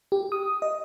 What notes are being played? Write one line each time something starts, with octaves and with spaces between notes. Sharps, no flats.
G4
D#6
D#5